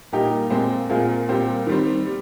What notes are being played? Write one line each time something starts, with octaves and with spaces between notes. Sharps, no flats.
A#2 G3 A#3 D#4 G4
A#2 G#3 C4 G4
A#2 G#3 C4 F4 G#4
A#2 G3 C4 G4
D#3 G3 C4
G3